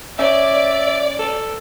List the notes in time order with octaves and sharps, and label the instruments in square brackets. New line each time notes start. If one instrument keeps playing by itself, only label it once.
[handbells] C#4 C#5 [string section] D5 [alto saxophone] E5
[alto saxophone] A4